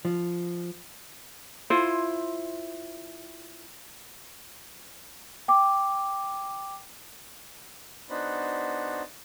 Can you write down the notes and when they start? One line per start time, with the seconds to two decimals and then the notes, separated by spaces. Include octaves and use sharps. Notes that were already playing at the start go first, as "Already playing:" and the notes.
0.05 F3
1.70 E4 F4 C5
5.48 G5 D6
8.10 B3 D4 D#4 F#4 C5 B5